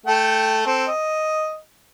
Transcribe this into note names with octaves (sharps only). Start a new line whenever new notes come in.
A3 A4 G5
C4 A4
D#5